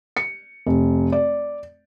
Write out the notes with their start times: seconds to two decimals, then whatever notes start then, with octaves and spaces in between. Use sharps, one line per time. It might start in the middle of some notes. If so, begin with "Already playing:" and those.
0.17 C#7
0.66 F1
1.12 D5